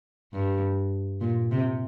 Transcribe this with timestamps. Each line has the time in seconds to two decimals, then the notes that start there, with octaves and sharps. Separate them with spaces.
0.33 G2
1.21 A#2
1.51 C3